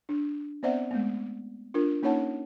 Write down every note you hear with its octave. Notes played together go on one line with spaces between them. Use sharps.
D4
B3 C4 C5 D5 E5 F#5
G#3 A3 B3
D4 F4 A#4
A#3 C#4 D#4 C#5 F#5 A5